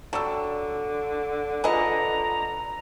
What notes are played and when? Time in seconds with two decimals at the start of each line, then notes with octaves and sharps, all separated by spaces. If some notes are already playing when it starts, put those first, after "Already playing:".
0.13 D3 F#3 G3 A5 C#6 E6
1.64 F4 G#4 A4 B4 D#5 A#5